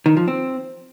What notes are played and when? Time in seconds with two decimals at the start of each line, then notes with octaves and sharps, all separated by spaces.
0.06 D#3
0.17 F3
0.28 C4